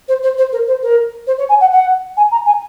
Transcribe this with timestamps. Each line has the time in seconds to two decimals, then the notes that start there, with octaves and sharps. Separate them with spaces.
0.08 C5
0.23 C5
0.37 C5
0.52 A#4
0.67 C5
0.82 A#4
1.27 C5
1.38 C#5
1.49 G#5
1.60 F#5
1.72 F#5
2.17 G#5
2.31 A#5
2.46 G#5